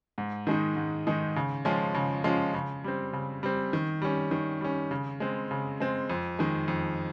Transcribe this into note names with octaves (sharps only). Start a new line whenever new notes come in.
G#2
D#3 G#3 D#4
G#2
D#3 G#3 D#4
C#3
F3 G#3 C#4 F4
C#3
F3 G#3 C#4 F4
C#3
G3 C4
C#3
G3 C4
D#3
G3 C#4
D#3
G3 C#4
C#3
G#3 C4
C#3
G#3 C4
F2
D#3 G#3
F2